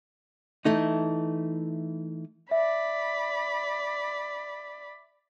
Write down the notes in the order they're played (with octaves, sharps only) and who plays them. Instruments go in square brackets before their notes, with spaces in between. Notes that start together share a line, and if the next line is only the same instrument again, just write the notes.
[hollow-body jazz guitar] E3 A3 D#4
[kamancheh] D5 B5 [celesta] E5